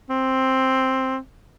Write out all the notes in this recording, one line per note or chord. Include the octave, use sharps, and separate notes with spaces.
C4